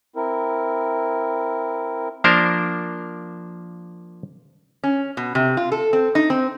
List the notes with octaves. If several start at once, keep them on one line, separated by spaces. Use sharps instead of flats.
C4 E4 A#4
F3 A#3 D4 A#4 C5
C#4
B2
C3
F4
A4
C4
D#4
C4